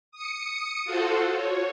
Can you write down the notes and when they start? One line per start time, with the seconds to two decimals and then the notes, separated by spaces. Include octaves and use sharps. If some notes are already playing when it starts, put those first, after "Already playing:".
0.12 D#6 C#7
0.85 F4 F#4 A4 C5
1.34 C#5